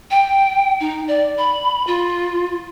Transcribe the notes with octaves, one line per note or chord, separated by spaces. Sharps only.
G5
D#4
D5
B5
F4